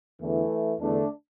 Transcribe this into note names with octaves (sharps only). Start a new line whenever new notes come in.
E2 D3 E3 A3
E2 D3 A3 D4